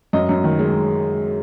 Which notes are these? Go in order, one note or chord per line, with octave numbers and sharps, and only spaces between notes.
F#2 D#5
F#2
D#3
G#3